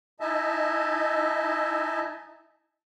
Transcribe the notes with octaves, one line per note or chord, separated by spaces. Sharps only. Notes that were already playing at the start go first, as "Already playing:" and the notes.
D#4 E4 D#5 E5 G#5 A5